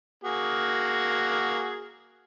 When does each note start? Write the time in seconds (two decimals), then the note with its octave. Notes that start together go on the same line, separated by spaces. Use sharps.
0.24 A#3 F#4 G#4